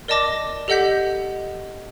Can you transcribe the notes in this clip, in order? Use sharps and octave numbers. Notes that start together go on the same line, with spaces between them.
A#4 D5 D#5 A5 D6 A#6
G4 A4 D#5 F#5 G6 B6